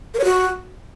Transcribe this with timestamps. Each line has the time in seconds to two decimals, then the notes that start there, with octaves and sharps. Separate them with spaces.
0.14 A#4
0.19 C#5
0.24 F#4